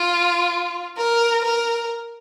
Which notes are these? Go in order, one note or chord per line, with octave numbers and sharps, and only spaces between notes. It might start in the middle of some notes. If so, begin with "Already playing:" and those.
Already playing: F4
A#4
A#4